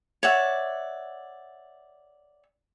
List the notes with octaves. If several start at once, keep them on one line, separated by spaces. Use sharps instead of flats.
C#5 D5 E5 F#5